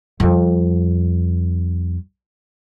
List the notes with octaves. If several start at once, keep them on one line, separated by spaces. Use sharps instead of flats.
F2 G3